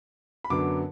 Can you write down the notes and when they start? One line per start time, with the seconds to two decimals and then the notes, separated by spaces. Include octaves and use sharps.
0.44 B5
0.50 F#2 D3 F#3 B3 D6